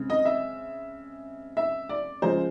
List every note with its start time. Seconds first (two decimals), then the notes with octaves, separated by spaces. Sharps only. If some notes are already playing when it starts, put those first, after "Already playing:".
Already playing: C#3 G#3 C4
0.10 D#5
0.25 E5
1.57 E5
1.89 D5
2.22 C#3 F3 G#3 C5